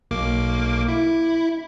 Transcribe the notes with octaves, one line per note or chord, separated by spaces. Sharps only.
B1 A#3 D6
E4